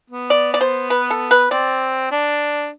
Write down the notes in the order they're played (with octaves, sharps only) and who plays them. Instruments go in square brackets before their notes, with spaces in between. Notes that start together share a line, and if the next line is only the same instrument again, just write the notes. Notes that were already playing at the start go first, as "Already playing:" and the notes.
[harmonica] B3
[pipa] D5
D5
C5
B4
A4
B4
[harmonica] C4 [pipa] D5
[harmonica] D4